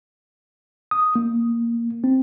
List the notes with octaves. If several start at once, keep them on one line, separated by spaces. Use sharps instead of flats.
D#6
A#3
C4